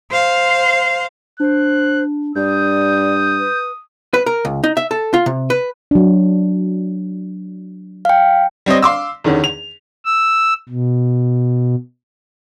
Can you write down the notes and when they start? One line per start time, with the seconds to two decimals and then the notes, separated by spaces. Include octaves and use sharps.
0.10 C5 F5
1.40 D4 C5 F#6
2.36 G2 D5 D#6 G6
3.39 B4
4.14 B4
4.26 A#4
4.45 C#2
4.64 D#4
4.77 E5
4.91 A4
5.14 F4
5.26 C3
5.50 B4
5.91 F#3 D4
8.05 F5 G5
8.66 G3 C4 C#5 D#5
8.82 F5 C6 D6 E6
9.24 E2 D3 D#3 C#4
9.44 F7
10.05 E6
10.69 B2